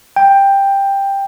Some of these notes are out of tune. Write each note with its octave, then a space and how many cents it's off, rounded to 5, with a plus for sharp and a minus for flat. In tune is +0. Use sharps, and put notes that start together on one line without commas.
G5 +10